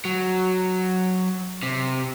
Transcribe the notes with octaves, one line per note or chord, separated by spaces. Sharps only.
F#3
C3